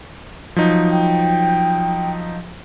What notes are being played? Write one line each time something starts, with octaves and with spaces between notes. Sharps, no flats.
F3 F#3 D#4
G5